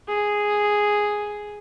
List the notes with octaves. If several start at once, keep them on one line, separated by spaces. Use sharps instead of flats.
G#4